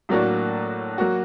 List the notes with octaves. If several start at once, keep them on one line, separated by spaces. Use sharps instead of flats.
A2 F#3 A#3 D4 F#4
F#3 A#3 F#4